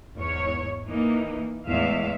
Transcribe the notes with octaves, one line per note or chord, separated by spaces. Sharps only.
E2 G#2 C#5
E3 A#3 D#4
E2 A2 G#3 E5 F5